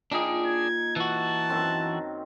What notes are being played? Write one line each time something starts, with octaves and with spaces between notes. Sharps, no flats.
A#2 D4 D#4 G#4 G5
G#6
E3 F#4 A5
F#2 D#3 C4